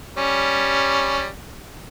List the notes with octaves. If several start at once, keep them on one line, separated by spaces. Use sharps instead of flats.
G3 C#4